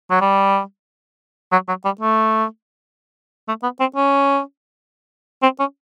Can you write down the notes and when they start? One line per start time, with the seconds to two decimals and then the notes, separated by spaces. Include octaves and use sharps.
0.10 F#3
0.21 G3
1.52 F#3
1.68 F#3
1.85 G3
2.01 A3
3.48 A3
3.63 B3
3.80 C4
3.96 C#4
5.43 C4
5.59 C#4